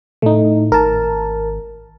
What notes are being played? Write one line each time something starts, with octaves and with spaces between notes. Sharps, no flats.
A2 A3 D#4
G#1 A#4 A5